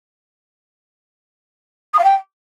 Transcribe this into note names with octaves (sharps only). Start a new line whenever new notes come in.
D#6
F5
G5